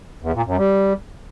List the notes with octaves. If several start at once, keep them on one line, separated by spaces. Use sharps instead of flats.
E2
A#2
F#2
G3